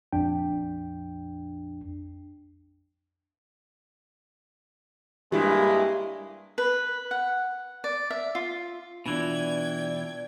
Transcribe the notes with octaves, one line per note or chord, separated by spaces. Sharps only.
A#1 F2 D4 G5
G2 G3 G#3 A#3 E4
B4
F#5
D5
E5
F4
B2 E3 D4 F4 D5 G5 G#6